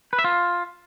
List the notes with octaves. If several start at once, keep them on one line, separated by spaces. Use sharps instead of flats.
B4
E5
F4